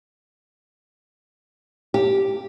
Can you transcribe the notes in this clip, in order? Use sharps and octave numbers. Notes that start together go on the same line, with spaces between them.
G4